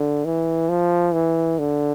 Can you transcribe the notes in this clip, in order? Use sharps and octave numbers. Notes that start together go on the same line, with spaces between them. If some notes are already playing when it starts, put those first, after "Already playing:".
Already playing: D3
E3
F3
E3
D3